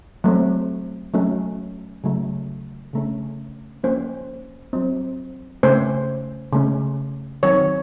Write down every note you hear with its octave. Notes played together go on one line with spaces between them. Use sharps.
F#3 A3 C4
F#3 A3 C#4
C#3 F#3 A3
C#3 A3 C#4
F3 A#3 C#4 C5
F#3 C4
C#3 A3 C#4 C5
C#3 A3 C#4
D#3 F#3 C4 C#5